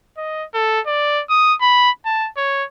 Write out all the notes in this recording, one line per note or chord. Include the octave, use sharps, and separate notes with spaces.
D#5
A4
D5
D#6
B5
A5
C#5